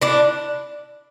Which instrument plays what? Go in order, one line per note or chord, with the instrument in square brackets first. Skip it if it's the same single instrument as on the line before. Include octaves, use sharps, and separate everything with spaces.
[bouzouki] D4 E4